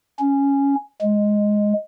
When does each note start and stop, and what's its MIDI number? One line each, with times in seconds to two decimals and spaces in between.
0.20 0.75 61
1.01 1.73 56